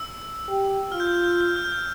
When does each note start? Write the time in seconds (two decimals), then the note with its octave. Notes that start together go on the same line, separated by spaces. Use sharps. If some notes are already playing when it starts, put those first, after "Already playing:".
Already playing: E6
0.49 G4
0.92 F4 F6
1.00 G6
1.07 F6
1.15 G6
1.24 F6
1.31 G6
1.41 F6
1.49 G6
1.56 F6
1.64 G6
1.72 F6